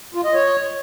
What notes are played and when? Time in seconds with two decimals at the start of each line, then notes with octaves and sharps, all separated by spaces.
0.15 F4
0.24 D#5
0.34 C#5